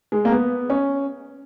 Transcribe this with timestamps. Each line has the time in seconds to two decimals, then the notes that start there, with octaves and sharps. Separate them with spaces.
0.12 G#3
0.25 A#3
0.32 B3
0.70 C#4